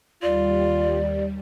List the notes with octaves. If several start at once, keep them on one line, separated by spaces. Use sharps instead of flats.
D#2 G3 F4 D5